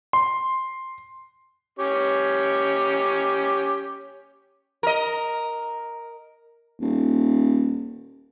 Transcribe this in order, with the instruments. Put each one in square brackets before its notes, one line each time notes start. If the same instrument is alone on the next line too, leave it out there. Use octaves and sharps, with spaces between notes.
[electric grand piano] C6
[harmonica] C#4 G4 C#5
[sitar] A#4 D#5
[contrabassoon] D#1